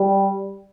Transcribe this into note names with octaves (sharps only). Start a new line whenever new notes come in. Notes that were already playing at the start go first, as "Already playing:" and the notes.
Already playing: G3